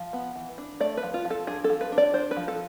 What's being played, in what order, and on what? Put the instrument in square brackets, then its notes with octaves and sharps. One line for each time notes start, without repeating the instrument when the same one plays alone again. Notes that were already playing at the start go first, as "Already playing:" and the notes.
Already playing: [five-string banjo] F3
B3
E3
D4
A3 D5
B4
F3
F4
F3
A4
D4 G#4
A4
F3
B4
D4
D5
D4 C5
B4
F3
A4